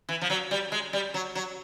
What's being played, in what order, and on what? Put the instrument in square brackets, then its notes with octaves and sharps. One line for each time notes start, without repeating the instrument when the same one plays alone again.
[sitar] E3
F3
F#3
G3
G#3
G3
F#3
F#3